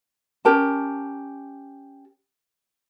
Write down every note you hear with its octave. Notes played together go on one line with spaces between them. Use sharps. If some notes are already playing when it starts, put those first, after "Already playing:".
C#4 G4 A#4 A5